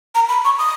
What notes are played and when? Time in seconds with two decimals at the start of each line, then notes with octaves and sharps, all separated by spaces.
0.15 A#5
0.29 B5
0.45 C#6
0.59 D#6